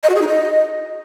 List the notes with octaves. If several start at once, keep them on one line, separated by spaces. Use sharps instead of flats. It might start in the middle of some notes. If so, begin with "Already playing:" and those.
D#5
F#4
G#4
D#4
D#5